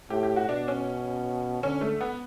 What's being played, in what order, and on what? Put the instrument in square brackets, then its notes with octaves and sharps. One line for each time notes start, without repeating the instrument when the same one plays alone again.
[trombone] A2 [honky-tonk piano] G4
[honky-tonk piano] G4
F#4
[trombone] B2 [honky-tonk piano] D4
[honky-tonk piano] C#4
[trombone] D3 [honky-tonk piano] C#4
[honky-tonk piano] A3
B3